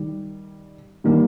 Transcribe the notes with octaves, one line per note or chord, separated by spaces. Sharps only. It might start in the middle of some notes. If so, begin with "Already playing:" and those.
Already playing: D#3 G3
D#3 G3 A#3